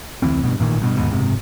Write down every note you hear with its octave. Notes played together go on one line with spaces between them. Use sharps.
F1 D2 E3 C4
G2 B2
A1 A#2 D#3
G2 B2
D#2 G#2 B2
F#1 G#2 C3